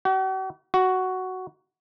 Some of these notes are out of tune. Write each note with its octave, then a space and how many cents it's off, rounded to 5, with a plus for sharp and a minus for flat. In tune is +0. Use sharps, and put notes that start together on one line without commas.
F#4 +45
F#4 +5